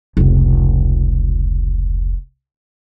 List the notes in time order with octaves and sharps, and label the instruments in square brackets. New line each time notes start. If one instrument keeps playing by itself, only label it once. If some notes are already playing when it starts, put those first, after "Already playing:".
[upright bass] F1 C#2